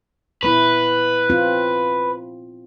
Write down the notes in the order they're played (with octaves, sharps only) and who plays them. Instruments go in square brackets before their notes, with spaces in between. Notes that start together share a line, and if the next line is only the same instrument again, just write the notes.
[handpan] A#2 B3 E4 [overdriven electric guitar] B4
[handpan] C4 F4